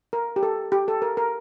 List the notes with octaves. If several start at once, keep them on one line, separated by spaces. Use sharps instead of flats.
A#4
G4
A4
G4
A4
A#4
A#4